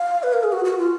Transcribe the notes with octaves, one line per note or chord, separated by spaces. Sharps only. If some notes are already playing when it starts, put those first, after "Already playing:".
Already playing: F5
B4
A#4
G#4
F#4
F#4
F4